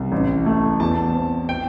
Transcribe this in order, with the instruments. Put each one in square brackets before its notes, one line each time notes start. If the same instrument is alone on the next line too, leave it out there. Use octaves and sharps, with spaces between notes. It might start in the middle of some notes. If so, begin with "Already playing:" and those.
Already playing: [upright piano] C2
A1
A3
E2 A5
C4
G5